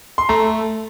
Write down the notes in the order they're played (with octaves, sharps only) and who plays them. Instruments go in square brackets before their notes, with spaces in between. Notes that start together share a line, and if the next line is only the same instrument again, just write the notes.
[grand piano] C6
[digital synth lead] A3 [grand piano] A#5